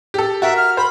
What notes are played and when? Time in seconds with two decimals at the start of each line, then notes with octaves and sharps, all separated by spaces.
0.14 G4 A4
0.42 F#4 A#4 E5
0.57 F6
0.77 C5 B5